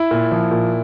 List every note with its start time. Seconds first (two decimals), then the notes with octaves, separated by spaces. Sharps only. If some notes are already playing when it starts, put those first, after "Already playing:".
Already playing: E4
0.11 A#2
0.32 F3
0.51 A#2